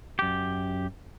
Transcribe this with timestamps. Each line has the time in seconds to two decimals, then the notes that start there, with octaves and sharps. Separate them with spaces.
0.19 F#2 G4